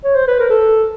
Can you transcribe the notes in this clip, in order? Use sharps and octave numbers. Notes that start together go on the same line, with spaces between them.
C#5
C5
B4
A#4
A4